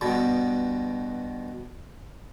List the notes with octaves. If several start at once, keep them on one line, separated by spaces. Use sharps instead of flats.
G2 B2 D3